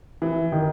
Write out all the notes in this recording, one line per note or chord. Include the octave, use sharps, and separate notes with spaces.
E3
D#3